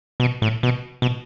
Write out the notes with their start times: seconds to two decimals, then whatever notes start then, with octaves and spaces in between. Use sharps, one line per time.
0.20 B2
0.42 A2
0.63 B2
1.02 B2